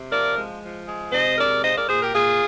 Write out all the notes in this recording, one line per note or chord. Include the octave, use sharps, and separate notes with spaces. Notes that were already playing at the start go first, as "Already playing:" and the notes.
Already playing: C3
F3 A#4 D5
G#3
F3
G#3
C3 C5 D#5
G#3 A#4 D5
A#2 C5 D#5
A#4 D5
A#2 G#4 C5
G4 A#4
A#2 F4 G#4